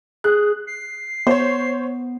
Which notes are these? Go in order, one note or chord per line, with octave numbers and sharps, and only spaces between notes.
G#4 F#6
C7
B3 C5 C#5